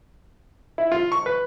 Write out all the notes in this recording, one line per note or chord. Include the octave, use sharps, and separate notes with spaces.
E4
F4
C#6
B4